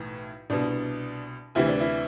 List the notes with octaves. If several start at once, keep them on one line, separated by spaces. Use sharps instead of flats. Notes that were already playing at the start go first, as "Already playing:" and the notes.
Already playing: B1 A2 E3
C2 B2 D4
D2 C3 E3 E4
D4
E4